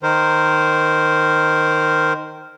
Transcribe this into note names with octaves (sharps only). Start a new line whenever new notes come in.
D#3 A#4 C5